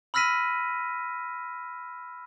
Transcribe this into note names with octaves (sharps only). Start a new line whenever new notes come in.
B5 E6 F6 A#6 B6 D#7